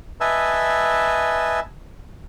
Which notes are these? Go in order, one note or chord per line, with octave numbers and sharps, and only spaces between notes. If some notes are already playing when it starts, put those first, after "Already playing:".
B4 D#5 E5 G#5 A5 E6